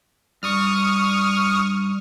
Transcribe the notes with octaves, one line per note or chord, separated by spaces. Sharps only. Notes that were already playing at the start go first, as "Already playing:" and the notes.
G2 C#6 D#6 F6